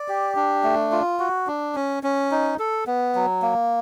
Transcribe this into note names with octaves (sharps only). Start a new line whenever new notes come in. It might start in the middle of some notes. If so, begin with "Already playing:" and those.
Already playing: D5
G4
D4
A3
F4
F#4
D4
C#4
C#4
D#4
A4
B3
F#3
A#3